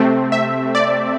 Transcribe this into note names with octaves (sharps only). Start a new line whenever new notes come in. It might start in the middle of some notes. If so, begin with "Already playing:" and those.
Already playing: C3 A3 C4
E5
D5